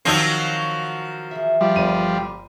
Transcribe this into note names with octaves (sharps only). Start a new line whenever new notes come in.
D#3 F3 F#3 C4 E6 C7
E3 G#4 E5
F3 G3
G1 D#7